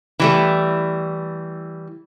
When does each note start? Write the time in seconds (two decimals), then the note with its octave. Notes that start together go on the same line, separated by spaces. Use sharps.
0.20 E3 G3 A3